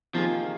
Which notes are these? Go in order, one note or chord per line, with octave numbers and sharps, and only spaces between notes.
C3 D#3 F3 A#3 F4 G#4